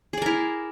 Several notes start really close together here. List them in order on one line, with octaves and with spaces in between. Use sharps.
G#4 D5 A#4 E4